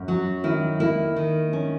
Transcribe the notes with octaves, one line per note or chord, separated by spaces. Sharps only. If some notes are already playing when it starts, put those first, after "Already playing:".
Already playing: F#2
F#3 F#4
D#3 E4
A#3 E4
D#3
C#4